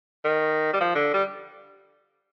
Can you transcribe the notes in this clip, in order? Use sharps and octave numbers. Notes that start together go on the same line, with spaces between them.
D#3
G3
F3
D3
G3